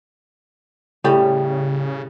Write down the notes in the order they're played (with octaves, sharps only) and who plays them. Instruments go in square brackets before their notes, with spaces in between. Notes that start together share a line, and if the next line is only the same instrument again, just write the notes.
[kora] A2 G3 [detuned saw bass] C#3